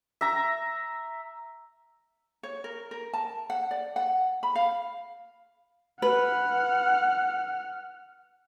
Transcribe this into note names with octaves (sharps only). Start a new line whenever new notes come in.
E5 A#5
C#5
A#4
A#4
A5
F#5
D5
F#5
B5
F5
B4 F#5 F6